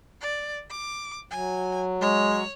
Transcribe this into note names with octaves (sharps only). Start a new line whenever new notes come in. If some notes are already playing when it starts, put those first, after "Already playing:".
D5
D6
F#3 G#5
G#3 C#5